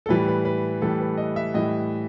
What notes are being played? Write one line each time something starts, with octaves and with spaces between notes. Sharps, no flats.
A4
A2 E3 G3 B4
B4
B4
A2 E3 G3 A4
B4
D#5
E5
A2 E3 G3 D#5